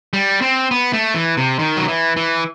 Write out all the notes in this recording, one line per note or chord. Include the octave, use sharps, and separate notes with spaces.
G3
C4
B3
A3
E3
C3
D#3
F#3
E3
E3